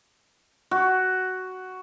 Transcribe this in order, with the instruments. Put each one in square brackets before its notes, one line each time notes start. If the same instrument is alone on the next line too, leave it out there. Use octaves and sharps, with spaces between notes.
[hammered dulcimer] F#4